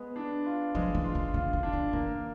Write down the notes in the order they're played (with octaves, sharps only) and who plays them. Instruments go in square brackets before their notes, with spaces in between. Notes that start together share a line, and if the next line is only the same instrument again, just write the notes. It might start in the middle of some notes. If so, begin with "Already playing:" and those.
Already playing: [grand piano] G#3 B3
D4
F4
[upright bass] F3 [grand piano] G#3
[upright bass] E3
[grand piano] F4
[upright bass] D#3
[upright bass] D3 [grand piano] F4
[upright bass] D3
[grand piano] D4
[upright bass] D3
[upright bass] D#3 [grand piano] A#3